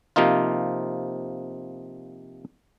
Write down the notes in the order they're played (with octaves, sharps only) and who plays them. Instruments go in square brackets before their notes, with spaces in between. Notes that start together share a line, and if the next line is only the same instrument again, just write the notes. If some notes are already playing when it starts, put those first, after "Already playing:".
[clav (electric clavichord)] C3 F3 A#3 D#4 F4